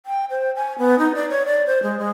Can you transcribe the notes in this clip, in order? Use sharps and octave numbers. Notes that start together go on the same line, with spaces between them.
G5
C5
G#5
B3
D#4
D5
C#5
D5
C5
G#3
G#3